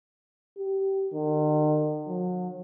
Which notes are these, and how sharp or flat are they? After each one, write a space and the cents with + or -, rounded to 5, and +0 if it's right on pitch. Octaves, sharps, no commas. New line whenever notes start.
G4 -20
D#3 -40
F#3 -40